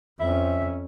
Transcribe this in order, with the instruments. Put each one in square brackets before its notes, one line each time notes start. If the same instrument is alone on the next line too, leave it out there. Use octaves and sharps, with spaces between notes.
[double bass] F2 C#4 [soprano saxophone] E5